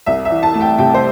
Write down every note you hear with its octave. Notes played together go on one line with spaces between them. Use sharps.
C2 E5
E5
E3
A5
A3
G5
C3 G5
C5